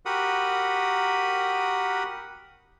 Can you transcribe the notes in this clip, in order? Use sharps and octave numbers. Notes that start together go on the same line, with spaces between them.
F#4 G4 A#4 F#5 B5 D#6